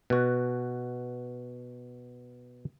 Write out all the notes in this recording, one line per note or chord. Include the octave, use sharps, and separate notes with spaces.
B2 F#4